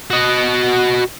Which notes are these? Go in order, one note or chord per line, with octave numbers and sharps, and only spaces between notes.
F#4 D#5